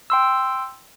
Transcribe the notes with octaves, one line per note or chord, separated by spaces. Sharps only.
G5 C6 E6